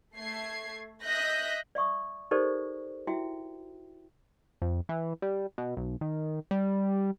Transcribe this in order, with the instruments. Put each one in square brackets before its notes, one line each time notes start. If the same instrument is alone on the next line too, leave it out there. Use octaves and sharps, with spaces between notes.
[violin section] A3 G#6 C7
D#5 E5 F#6 G6 A#6 B6
[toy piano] D5 E5 C#6 D#6
D#4 G4 A4 A#4 C5 D5
E4 F#4 E5 G5
[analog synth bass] F2
E3
G3
B2
B1
D#3
G3